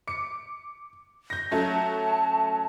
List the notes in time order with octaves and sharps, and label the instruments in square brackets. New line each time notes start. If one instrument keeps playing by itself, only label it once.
[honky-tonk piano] D6 C#7
G6 A#6
[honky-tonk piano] F#3 A3 C#4 [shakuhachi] A5